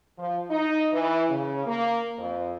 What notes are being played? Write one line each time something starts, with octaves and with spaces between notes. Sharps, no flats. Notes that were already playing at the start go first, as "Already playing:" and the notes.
F3
D#4
E3
C#3
A#3
F2